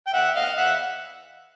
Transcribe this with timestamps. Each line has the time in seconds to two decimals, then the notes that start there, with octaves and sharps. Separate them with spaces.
0.07 G5
0.14 E5 F#5
0.36 D#5 F5
0.58 E5 F#5